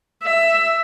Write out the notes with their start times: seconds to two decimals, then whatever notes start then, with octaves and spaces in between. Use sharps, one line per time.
0.23 E5